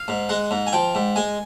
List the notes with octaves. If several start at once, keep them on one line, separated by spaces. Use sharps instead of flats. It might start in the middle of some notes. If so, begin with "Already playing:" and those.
Already playing: F5
G#2
G#3 F#5
G#2
G#5
F3 G5
G#2
G#3 G#5